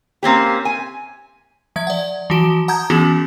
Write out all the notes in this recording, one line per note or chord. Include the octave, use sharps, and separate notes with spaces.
A#3 C4 C#4 G4
G#5
F3 E5 G#6
D5 F#5
E3 F3 F#4 D7 G7
F#5 A5 A#5 D#6 G6 G#6
E3 B3 C#4 F#4 G#4